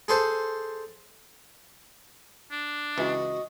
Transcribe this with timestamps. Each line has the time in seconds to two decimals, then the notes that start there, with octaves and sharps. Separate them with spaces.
0.08 G#4 A4 C5
2.51 D4
2.98 C#2 E3 F#4 D#5